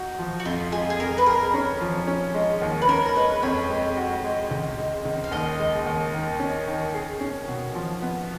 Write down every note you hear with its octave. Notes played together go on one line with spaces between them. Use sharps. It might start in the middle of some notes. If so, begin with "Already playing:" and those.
Already playing: D#4 F#4
F3
F#4
F2 F4
G#3 G#4
G#4
F2 A#4
B4
G#4 A#4
C#4
F3
C#4
G#3
D#2
B4
C#4 A#4
A#4
G#3 B4
F2 C#5
G#3
F#4
G#3
C#2
G#3
C#2
F5
D#2 D#5
G#3
D#2
D#3
C#4
D#3
G#4
C#4
B2
F3
B3